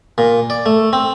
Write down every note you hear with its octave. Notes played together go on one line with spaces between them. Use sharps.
A#2
D5
A3
C4